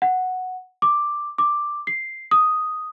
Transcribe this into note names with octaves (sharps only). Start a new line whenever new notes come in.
F#5
D6
D6
C7
D#6